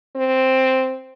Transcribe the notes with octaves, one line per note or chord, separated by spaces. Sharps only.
C4